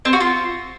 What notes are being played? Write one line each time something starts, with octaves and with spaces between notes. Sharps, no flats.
C4
F#4
F4